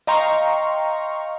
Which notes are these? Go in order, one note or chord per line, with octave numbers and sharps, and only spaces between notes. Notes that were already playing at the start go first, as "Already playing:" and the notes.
D#5 F5 G5 A#5 C6 C#6